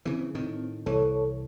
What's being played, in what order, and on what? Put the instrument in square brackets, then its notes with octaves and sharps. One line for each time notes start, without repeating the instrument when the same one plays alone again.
[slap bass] C#3 E3 [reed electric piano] C4
[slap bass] A2 D#3
[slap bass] C2 E3 [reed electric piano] A4 C#5